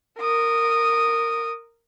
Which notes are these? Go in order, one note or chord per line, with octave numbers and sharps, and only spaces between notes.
A#4 D#6